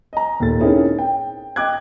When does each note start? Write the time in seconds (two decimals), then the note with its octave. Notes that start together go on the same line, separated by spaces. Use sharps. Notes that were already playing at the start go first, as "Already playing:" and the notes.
0.13 D#5 A#5
0.40 D#2 A#2 A4 A6
0.60 C4 C#4 D#4 E4 G#4 A#4
0.99 G5
1.56 D#5 G5 D6 F#6 G#6